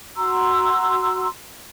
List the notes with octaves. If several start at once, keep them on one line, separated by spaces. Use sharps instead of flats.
F#4 A#5 C6 E6